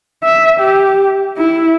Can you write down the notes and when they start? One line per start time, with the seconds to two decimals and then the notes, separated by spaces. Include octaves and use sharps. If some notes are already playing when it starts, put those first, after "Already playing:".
0.24 E5
0.60 G4
1.38 E4